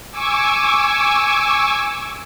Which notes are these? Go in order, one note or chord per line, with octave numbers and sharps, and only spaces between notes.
G#5 C#6 D6 E6